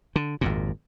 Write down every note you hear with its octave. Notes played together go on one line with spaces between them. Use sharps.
D3
G#1 F2 A#2